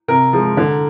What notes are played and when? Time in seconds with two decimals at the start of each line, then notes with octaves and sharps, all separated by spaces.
0.08 C3 A#4
0.33 F3 G#3
0.57 D3